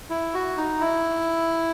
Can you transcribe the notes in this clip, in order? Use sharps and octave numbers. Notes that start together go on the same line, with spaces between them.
E4
F#4
D#4
E4